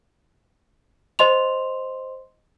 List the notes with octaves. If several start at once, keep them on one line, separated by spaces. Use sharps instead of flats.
C5 D#5 C6 F7